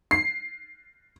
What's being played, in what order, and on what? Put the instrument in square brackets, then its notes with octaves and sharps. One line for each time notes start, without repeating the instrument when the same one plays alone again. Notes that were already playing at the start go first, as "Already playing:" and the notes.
[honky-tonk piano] C7